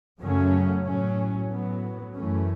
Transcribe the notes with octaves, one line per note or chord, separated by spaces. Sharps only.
F#2 C#3 F#3 A3 C#4
A2 F#3 C#4
A2 F#3 B3
F#2 E3 A3 C#4